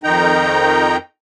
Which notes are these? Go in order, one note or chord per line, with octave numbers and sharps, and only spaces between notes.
F2 D#3 D#4 G5 A#5